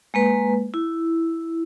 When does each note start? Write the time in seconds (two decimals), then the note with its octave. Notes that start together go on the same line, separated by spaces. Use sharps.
0.14 G#3 A#3 B4
0.74 E4